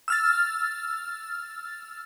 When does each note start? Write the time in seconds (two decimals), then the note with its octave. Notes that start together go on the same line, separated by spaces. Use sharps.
0.08 E6 F6 A6